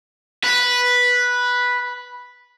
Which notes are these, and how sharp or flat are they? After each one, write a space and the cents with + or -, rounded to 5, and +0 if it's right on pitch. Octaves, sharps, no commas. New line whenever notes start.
B4 -5